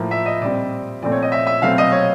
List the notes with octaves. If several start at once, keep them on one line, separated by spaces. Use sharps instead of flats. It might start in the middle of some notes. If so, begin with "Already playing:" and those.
Already playing: A2 F3 A#3
E5
D#5
A#2 G3 C4 D5
A#2 F3 A3 C4 D5
C#5
D#5
E5
E5
B2 F#3 A3 C4 F5
D#5
C#5